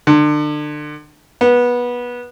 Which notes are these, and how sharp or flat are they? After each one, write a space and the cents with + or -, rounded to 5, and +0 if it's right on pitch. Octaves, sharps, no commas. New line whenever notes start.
D3 +35
B3 -20